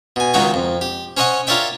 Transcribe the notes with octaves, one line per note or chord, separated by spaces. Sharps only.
B2 G#5
C#2 D#3 F#3 F#5 G5 C#6
F2
G4
C#4 C5 C#5 D#5 F#5 C#6
F4 A#4 C#5 D5 E5 G5